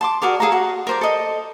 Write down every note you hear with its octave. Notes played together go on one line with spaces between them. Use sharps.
A5 C6 D6
F#4 G#4 A#4 D5
G#4 A4 F5 A#5
F#4
A#4 C5 D5
A4 D#5